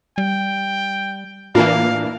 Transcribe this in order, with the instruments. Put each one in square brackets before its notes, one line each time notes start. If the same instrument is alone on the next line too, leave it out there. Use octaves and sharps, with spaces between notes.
[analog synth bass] G3 [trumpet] G5
[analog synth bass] A2 [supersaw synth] E3 A#3 D4 [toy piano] F4 [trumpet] F5